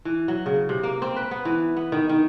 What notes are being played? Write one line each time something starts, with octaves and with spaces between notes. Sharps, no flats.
E3
F#3
C#3
C3
A#3
C4
B4
B3
E3
B3
D#3
D#3